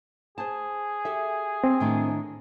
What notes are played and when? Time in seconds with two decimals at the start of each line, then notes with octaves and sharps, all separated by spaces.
0.38 G#4 C5 A5
1.05 G4 A4 E5
1.64 C4
1.80 A2 D#3 D4